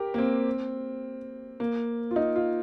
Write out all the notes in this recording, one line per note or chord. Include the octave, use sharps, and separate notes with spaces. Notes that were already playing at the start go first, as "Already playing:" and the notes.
Already playing: G4 A#4
A#3
C4
A#3
F4
D#4
F4